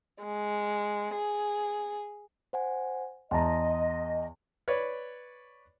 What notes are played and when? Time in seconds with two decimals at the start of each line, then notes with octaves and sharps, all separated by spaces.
0.25 G#3
1.15 G#4
2.53 C5 F#5 G#5
3.31 E2 D#5 A5 A#5 C6
4.68 B4 C#5 D5